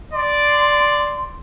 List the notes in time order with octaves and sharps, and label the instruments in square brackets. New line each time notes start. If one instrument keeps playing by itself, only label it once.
[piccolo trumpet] D5 [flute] C6